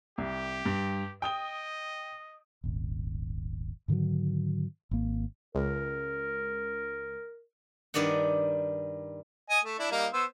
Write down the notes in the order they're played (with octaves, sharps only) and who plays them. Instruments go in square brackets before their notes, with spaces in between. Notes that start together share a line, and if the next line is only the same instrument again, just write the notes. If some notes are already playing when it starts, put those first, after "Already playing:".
[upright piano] C2 [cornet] G4
[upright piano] G2
[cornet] D#5 [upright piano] G5 D#6 G7
[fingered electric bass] D#1 G#1
G#2 D3 D#3 F#3
G#1 A#3
[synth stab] C#2 [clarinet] A#4
[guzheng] G2 D#3 D5 D#5 F#5
[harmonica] D#5 G#5
A3
D4 E4
G3 A#3 D#4
B3 C5 E6